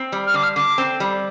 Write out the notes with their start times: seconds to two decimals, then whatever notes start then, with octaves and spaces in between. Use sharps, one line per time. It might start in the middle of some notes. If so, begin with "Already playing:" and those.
Already playing: C4
0.12 G3
0.27 F6
0.34 D3 D6
0.43 F6
0.56 D3 D6
0.78 C4
1.00 G3